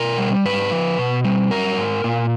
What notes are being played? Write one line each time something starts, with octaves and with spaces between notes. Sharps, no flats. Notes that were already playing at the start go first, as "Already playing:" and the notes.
Already playing: B2 A#4
G3
G#2 B4
F3
B2
G3
F#3 A#4
G#2
A#2